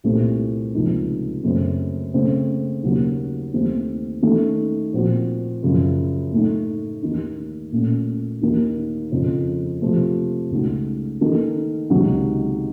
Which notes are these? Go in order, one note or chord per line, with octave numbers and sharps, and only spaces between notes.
C2 A#2 A3 C4
C#2 C3 F3 A#3 D#4
F#2 C#3 A3 C4
C#3 A3 C4
D#2 C#3 F#3 A#3
D#2 D#3 A3 C4
D#3 A3 C#4 A4
A#2 F3 C4 F#4
F#2 C#3 F3
A2 A3 D#4
D#2 D#3 A#3 D#4
A#2 A3 C#4
D#2 D#3 A#3
F2 C#3 F3
C3 F3 A3
C#2 C#3 A3 D#4 F#4
D#3 A#3 D#4 A4
C#2 C3 D#3 F#3